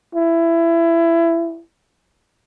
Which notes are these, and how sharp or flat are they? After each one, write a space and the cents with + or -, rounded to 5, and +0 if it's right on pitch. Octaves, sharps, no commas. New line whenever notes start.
E4 +20